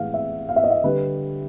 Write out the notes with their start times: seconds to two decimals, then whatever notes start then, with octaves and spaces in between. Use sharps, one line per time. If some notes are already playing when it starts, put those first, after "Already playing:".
Already playing: A2 E3 G#3 F5 F#5
0.14 E5
0.49 F5
0.56 E5
0.64 D#5
0.70 E5
0.84 D3 G3 B4